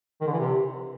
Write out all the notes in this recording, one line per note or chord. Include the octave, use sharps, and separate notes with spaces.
D#3
D3
E3
C3